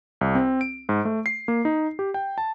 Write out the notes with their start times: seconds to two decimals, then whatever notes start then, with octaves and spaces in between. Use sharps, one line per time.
0.21 C2
0.35 C4
0.61 D7
0.89 G#2
1.05 A3
1.26 C7
1.48 A#3
1.65 D#4
1.99 G4
2.14 G5
2.38 A5